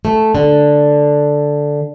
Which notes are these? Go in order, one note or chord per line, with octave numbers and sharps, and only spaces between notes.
A3
D3